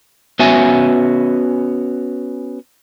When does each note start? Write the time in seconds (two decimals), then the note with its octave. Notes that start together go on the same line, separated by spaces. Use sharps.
0.39 B3 C#4 F#4 E5 G#5